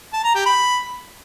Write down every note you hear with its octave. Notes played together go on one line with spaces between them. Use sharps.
A5
A#5
G4
B5